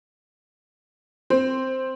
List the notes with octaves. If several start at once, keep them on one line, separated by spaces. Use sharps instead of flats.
C4